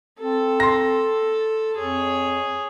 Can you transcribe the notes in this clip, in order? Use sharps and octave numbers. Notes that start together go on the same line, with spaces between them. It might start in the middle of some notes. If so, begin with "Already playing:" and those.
C4 A4
C6 A#6
F2 G#4 C#5